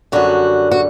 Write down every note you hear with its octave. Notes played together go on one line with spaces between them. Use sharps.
F#2 D3 G3 F#4
F#4